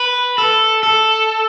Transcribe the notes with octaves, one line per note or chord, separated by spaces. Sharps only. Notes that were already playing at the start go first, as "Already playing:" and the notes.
Already playing: B4
A4
A4